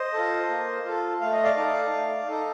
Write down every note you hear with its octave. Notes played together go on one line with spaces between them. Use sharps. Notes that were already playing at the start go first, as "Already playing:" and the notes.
Already playing: C5 D#5
F4 A4
A#3
F4 A4
A3 F5
D#5
D5 F5
D#4 A4
A3
D#4 A4